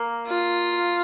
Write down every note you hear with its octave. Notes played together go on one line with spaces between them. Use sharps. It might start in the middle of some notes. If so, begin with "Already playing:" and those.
Already playing: A#3
F4